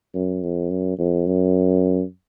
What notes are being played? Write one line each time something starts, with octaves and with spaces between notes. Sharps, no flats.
F#2
F2
F#2
F2
F#2